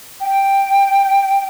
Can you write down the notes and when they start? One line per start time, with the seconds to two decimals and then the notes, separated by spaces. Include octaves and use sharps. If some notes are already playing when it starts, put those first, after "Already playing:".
0.20 G5